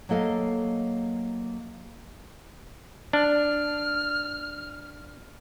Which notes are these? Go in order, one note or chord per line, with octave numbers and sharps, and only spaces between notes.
F#3 A#3 A4 D#5 F5
D4 F6